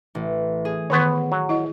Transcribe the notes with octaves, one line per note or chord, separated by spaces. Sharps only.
A1
G#4
D#3 B3 B4 C#5 C6 C#6
F#3
E4 D#5